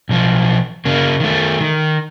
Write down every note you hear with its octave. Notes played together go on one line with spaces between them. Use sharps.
B1 F3
C#3 A#3
D#3 A3
D#3